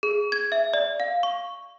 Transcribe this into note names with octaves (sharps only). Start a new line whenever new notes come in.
G#4
G#6
E5
D5
F5
C#6